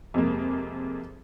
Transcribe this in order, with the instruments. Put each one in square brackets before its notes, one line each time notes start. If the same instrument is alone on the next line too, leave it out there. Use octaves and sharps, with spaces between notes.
[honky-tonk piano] F2 C3 G#3 A#3